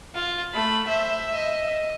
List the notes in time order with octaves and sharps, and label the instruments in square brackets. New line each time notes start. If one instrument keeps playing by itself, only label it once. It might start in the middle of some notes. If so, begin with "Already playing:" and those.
[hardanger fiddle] F4
[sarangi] A3 [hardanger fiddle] B5
[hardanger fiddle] C5 [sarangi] E5
[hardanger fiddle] D#5